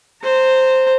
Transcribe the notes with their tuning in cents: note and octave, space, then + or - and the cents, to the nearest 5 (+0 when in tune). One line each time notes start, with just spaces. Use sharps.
C5 +0 A#5 -30